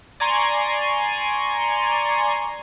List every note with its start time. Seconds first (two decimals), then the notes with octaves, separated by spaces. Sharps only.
0.20 D5 G#5 A#5 C6 C#6